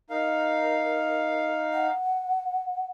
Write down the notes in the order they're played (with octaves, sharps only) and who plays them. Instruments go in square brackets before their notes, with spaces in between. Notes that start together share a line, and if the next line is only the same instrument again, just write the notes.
[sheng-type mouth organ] D#4 F5 [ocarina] A#4
[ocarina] F#5